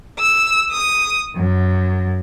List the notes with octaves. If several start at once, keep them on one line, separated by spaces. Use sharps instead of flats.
E6
D#6
F#2